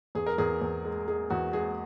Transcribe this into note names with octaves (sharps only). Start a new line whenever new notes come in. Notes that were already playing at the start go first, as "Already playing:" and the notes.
E2 G#4
A#4
E2 G#4
E2
G#3
G#3 G#4
E2 F#4
G#3 G#4